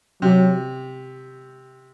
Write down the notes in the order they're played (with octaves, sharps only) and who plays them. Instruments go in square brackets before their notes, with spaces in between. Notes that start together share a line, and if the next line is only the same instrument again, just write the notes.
[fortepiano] C3 [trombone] F#3